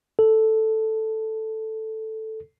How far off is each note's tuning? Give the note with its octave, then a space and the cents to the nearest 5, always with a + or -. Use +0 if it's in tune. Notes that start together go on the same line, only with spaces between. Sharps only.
A4 +0